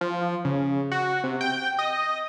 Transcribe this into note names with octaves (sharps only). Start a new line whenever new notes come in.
F3
C#3
F#4
C3
G5
D#5